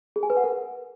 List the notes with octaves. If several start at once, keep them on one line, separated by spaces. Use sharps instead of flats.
G#4
G#5
B4
F#5
A#4